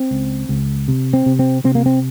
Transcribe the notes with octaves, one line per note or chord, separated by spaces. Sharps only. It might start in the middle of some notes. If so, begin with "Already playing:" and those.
Already playing: C4
C#2
C#2
C3
C4
C3
C4
C3 C4
A#3
C4